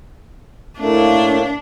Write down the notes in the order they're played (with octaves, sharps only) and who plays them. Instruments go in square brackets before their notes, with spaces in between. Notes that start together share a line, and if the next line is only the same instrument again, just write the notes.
[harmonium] A2 A3 A#3 [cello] D4